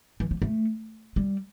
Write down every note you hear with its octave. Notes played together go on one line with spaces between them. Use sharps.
E3
F3
A3
G3